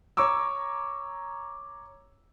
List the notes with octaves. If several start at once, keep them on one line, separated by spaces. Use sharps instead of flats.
C#5 A#5 C#6 D6 E6